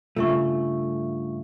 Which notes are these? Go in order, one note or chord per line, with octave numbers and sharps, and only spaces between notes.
G2 C#3 A3 F4 E5 C#6